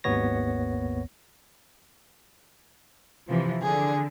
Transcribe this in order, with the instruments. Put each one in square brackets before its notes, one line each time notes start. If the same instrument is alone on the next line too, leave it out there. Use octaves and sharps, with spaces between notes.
[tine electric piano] G#1 D#2 B3 C#5 A#6
[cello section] C3 E3 F3
[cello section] D3 [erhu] G#4